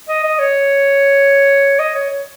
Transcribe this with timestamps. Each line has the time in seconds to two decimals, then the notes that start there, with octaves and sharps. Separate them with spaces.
0.08 D#5
0.24 D#5
0.39 C#5
1.79 D#5
1.95 C#5
2.10 C#5